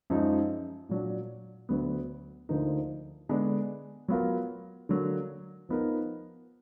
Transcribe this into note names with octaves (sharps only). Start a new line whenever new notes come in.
F#2 F3 G#3 D#4
A#2 F#3 D4
D2 D3 F#3 B3
D2 D3 F3 A#3 D#4
D3 G#3 B3 D4
F#3 B3 F4 A#4
D3 F#3 A#3
F3 B3 D#4 A#4